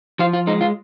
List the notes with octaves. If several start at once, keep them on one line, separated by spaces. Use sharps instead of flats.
F3 F4
F4
G#3 D#4
F4